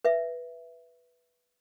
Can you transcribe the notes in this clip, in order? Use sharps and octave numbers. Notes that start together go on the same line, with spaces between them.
B4 E5